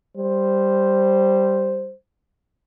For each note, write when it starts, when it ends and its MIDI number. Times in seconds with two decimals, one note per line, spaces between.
0.17 1.92 55
0.17 1.92 72